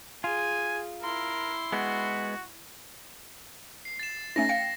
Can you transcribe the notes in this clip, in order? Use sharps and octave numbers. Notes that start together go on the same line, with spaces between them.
F4 G#4 G#5
E4 A#4 C6
G#3 B3 F#4
C7
A6 E7
A3 C#4 D#4 A#6
F5 G5 C#7